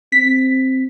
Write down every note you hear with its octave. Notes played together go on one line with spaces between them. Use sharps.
C4 B6